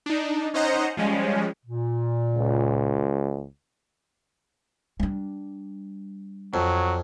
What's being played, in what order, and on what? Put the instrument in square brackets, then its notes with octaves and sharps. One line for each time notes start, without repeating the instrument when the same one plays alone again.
[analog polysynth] D4 D#4
C#4 D#4 C5 D#5 F#5 A#5
F3 G3 G#3 C#4
[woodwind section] A#2
[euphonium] C#2
[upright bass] G3 D4
[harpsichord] F2 [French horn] F#3